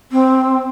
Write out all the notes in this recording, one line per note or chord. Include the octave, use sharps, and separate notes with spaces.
C4